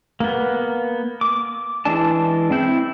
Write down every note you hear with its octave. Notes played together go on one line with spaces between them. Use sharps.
A#3 B3
D6
E3 G#3 D4 D5 A5
C4 E4 G6